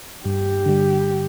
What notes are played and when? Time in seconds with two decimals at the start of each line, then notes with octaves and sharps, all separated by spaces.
0.25 G2 G4
0.66 D3 G3